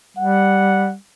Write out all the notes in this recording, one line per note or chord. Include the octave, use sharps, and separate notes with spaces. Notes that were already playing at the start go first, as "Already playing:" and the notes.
G3 F#5